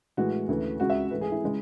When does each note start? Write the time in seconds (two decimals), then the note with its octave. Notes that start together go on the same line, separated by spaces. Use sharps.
0.17 A2 E3 G#3 F#4
0.49 D2 C#3 E3 A3
0.80 C#2 C#3 G#3 F#4
0.90 E5
1.10 G#2 E3 A3 B4
1.21 G#4
1.32 E4
1.44 C#3 G#3